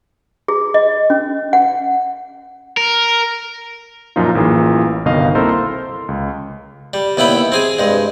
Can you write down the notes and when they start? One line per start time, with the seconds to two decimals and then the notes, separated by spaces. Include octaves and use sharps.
0.48 G#4
0.74 D#5
1.10 C#4
1.53 F#5
2.77 A#4
4.16 F#2 A#2 F3 D#4 F4
4.35 A1 E3 A#3 F4 G#4
5.05 G1 C2 B2 D#3 D#5 F5
5.35 A#3 C4 E4 A4 A#4 C5
5.49 C6
6.08 C#2
6.93 G3
7.17 D#2 B3 E4 G5 B5
7.52 C4 G#4 G#5
7.79 G2 G#3